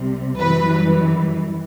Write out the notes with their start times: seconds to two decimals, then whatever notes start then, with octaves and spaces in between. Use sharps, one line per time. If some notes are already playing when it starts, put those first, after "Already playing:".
Already playing: C2 C3 G3
0.39 F#2 E3 G3 B4